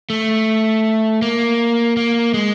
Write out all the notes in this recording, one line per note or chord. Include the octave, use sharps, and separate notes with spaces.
A3
A#3
A#3
G#3